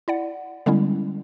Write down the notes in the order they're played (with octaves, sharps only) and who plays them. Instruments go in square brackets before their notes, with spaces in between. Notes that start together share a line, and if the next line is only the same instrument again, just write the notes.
[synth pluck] E4 D5 F#5
D3 G3 G#3 B3 C#4 E4